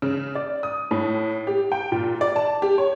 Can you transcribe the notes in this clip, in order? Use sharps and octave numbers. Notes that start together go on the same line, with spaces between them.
C#3
D5
D#6
A2
G4
G5
A#2
D5
A5
G4
C#5